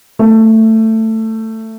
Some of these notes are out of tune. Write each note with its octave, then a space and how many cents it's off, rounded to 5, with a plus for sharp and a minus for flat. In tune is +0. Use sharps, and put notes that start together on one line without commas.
A3 +15